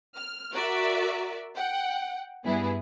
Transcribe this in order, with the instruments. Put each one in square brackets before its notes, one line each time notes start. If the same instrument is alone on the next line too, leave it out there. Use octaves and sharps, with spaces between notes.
[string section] F6
F#4 A#4 D5 E5
F#5 G5
G2 B3 E4 G#4